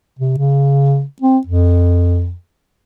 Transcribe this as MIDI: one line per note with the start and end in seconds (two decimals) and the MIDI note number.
0.19 0.34 48
0.38 1.03 49
1.22 1.39 60
1.47 2.34 41